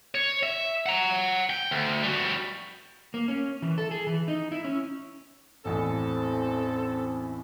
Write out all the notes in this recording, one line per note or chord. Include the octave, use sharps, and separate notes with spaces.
C#5
E5
F#5 A#5
G5
D2
G3 F#4
A#3
C#4
E3
A4
G#4
E3
D#4
E4
C#4
A1 E2 A2 C4 A4